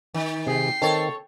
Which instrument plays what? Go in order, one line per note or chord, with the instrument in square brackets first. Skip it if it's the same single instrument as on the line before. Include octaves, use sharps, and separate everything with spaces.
[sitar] D#3
[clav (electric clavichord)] C3 G#4 [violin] G5 C7
[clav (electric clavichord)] D#3 C4 [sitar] A4 C#5